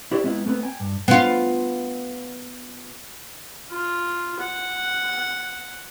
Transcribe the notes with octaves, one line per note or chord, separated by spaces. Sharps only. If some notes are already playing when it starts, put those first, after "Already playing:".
E4 F#4 G4 C5 D5
G#3 B3 C4 E4 F4
A3 B3 C4 B4
G5 G#5
G2
B3 F4
F4
F#5